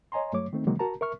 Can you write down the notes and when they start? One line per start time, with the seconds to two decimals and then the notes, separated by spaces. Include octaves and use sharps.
0.12 C#5 D#5 G#5 A#5 C6
0.33 G2 F#3 A3 C#5 D6
0.53 D#3 A3 C4 D#4
0.67 C3 D#3 E3 F#3 G#3 A#3
0.79 F#4 A#4 A5 A#5
1.01 A#4 E5 C#6 F6